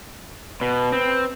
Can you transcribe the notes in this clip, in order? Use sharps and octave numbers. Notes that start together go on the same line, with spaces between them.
B2 B4
C4